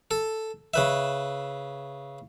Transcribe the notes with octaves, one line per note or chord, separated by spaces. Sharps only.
A4
C#3 B4 E5